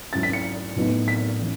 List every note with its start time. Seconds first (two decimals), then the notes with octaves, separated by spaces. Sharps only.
0.13 G#2 F#3 C#4 E4 A6
0.23 B6
0.33 C#7
0.76 A2 F#3 B3 D#4
1.08 B6
1.40 C#3 E3